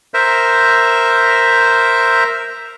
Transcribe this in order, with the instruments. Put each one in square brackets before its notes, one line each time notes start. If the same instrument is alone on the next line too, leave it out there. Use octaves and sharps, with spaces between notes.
[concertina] A#4 C5 E5